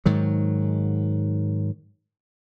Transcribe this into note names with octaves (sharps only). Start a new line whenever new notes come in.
G#2 D#3 F#3